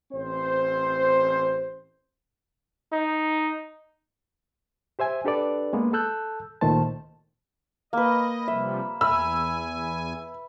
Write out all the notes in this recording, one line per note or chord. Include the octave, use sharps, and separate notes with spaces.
A1 C4 C5
D#4
G4 C5 E5 G#5
D4 G4 A4 B4 D5
G#3 A#3 B3
A4 A5 E6 F#6 G6
C#2 A#2 D#3 A3 C5 A5
A#3 B4 D#5
C3 F3 G3 E5
E2 E5 G#5 B5 E6